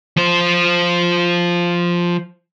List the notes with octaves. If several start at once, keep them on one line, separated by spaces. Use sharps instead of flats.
F3 C5